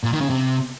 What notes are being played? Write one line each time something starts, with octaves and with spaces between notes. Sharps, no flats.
A#2
D#3
C#3
C3